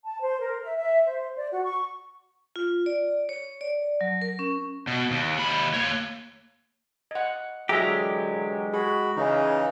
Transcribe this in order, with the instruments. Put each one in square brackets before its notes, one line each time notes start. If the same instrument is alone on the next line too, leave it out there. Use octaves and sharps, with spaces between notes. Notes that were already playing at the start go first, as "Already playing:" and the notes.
[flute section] A5
C5
A#4
E5
E5
C5
D5
F#4
C#6
[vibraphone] F4
D5
C#5
D5
F#3
A#4
C#4
[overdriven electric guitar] B2
D#2
D#2 B5
A#3 C#5
[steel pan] D#5 F#5
[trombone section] D3 E3 F#3 [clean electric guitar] G#3 G4 [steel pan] G#4 E5 A#5
[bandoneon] F#4 B5 [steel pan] G#4
[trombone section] C#3 [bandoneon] E3 D#4